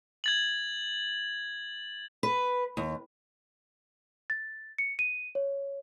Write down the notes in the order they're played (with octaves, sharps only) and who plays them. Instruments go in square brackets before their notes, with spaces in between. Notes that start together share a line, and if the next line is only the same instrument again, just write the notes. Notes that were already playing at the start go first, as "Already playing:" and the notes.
[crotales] G#6 A6 F#7
[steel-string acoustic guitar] B4
D#2
[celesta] A6
C#7
D#7
C#5